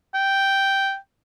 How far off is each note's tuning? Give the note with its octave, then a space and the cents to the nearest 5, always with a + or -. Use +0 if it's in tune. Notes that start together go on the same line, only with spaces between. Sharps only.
G5 -5